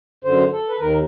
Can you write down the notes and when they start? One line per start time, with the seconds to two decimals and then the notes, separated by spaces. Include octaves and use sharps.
0.24 F#2 D3 C5
0.52 A4
0.69 B4
0.80 D#2 D#3 A#4